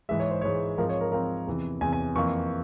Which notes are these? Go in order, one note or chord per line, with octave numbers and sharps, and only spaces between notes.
G#2 E3 G#3 E5
C#5
C5
G#2 E3 G#3 C#5
G#2 F3 C4 A#4
C#5
A#4
G#2 F3 C4 A#4
E2 C3 E3
E2 C3 E3 G#5
G#5
F2 E3 A#3 C#6